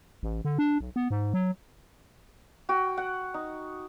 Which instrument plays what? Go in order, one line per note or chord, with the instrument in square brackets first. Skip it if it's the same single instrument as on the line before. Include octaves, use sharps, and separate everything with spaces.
[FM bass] A1
D3
D4
B1
B3
G#2
F#3
[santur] F#4 G5
F#5
D#4